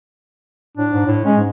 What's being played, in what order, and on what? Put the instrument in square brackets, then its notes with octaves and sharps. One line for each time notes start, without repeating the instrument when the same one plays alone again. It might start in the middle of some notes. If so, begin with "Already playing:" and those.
[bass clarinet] A2 [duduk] D4
[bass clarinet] G#2
A2
[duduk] G#3 [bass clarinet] C#4
[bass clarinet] G#2